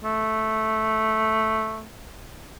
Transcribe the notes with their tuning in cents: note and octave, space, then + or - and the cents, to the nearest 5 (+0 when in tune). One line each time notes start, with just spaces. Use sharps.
A3 -5